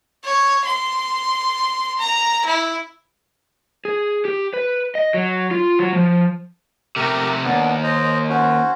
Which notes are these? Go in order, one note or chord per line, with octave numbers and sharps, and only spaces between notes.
C#5
C6
A#5
E4
G#4
G4
B4
D#5
F#3
F4
F#3
F3
C3 A3 G4 A#4
D#2 B3 D4
C5 D#5
C#4 F#4 C5